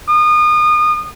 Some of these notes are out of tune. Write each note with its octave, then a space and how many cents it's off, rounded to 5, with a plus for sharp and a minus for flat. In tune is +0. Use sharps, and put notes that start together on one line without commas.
D#6 -30